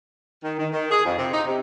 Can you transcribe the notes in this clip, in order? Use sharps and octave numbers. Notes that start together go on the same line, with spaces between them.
D#3
D#3
D#3
G#4
F2
C3
D#4
C3